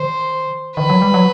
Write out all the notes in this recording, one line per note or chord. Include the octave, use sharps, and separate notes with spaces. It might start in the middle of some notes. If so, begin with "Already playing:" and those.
Already playing: D#3 C5
D#3 B4
F#3
G3
F#3